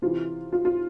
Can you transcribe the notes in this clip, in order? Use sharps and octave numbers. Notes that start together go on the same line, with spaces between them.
C3 E3 F4
F4
F4